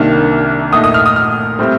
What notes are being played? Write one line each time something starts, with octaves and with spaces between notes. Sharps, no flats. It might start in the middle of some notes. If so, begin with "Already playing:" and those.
Already playing: C2 C3 D#3 A#3 D4 F6
A#2 A3 D#4 D#6
D#6
F6
D#6
F6
A2 G3 C4